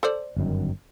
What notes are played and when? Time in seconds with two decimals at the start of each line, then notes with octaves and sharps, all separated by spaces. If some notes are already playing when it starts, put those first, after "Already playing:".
0.03 A4 C5 D5
0.37 G1 F#2 D#3